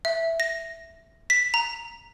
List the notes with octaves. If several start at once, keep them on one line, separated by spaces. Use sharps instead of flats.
E5
A#6
B6
A#5